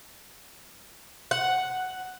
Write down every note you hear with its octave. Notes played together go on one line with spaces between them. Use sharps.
F#5